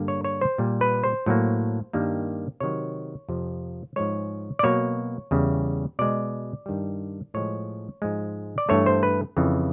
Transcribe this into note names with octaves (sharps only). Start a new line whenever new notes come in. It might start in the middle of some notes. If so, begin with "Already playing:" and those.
Already playing: G2 D3 G3 A#3
C#5
C#5
C5
A#2 G3 A#3
B4
C5
A2 F#3 A#3
G2 D#3 G3 A#3
C3 D#3 F#3 C#5
F2 C3 F3
G#2 F3 G#3 C#5
D5
B2 F#3 A#3 C#5
E2 C#3 E3 G3
B2 G#3 D5
G2 D#3 G3
A2 F3 G#3 C#5
G#2 F3 G#3
D5
G2 E3 A3 C#5
C5
B4
F2 C#3 E3